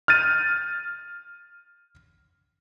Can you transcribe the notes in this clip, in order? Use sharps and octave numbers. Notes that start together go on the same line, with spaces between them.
F6 G6 A6 D#7